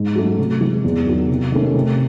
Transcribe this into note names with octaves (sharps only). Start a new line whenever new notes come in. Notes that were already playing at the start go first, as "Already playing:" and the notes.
Already playing: G#2
F#3 A3 C#4
C3
E3 G#3
E2
D#3 F#3
C3
D#3 A3 C#4
C3